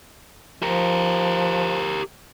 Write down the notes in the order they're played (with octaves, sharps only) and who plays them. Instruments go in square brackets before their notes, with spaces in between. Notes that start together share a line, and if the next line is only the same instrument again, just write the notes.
[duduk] F3 [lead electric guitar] G4 A#4